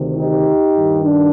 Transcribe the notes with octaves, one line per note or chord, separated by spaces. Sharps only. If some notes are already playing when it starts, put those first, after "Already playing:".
Already playing: D2 C3 D#3
D#4 G4
G2 D#3
D4